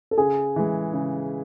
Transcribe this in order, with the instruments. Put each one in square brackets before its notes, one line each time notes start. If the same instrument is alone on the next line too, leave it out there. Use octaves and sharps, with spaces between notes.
[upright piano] A4
[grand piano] C#3 [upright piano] G#4
[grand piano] E3 G#3
C#3